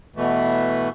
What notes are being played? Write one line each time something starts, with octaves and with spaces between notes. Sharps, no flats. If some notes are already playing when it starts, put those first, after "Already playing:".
B2 E3 A3